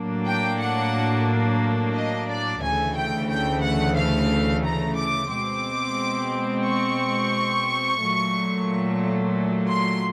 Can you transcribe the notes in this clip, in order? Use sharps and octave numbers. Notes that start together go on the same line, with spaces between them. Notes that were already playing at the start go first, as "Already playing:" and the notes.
Already playing: A2 F#3 A#3 D4
G5
F#5
D#5
D5
D2 C#3 E3 A3 G#5
G5
G5
F#5
F5
A#5
D6
B2 G#3 C4 D6
C#6
A#2 F#3 A3
C6